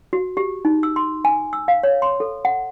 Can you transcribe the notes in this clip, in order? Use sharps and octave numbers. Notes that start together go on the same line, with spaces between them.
F#4
G4
D#4
E6
C6
G#5
E6
F5
C#5
C6
A4
F#5